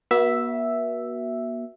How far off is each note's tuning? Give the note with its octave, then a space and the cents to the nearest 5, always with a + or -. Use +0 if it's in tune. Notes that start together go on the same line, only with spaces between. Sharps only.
B3 -45 F#4 +0 E5 +0